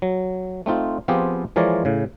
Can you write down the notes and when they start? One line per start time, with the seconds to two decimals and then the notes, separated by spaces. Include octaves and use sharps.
0.02 F#3
0.66 A3 C4 D#4 F4
1.08 F3 B3 C4 F4 G4 G#4
1.56 E3 F3 G#3 A#4 C#5 D5
1.85 A2 C#3